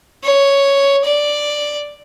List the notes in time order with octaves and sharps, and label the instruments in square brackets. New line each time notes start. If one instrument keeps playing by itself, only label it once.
[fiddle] C#5
D5